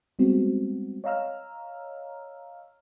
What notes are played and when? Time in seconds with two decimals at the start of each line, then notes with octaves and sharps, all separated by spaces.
0.19 G3 G#3 B3 C4 F#4
1.04 C#5 D#5 F5 A#5 E6 F6